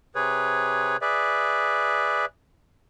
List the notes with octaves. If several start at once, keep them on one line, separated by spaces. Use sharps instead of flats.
C3 G#4 B4 C#5
G#4 B4 D5 E5